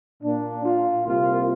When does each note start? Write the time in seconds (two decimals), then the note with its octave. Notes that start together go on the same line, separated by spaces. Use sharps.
0.23 A#2 A#3 D4
0.64 F4
1.05 C2 C3 A#3 F4